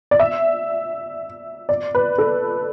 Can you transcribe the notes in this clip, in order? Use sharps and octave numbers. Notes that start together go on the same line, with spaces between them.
D5
E5
D5
B4
A4